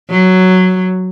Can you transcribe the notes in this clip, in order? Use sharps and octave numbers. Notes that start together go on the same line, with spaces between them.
F#3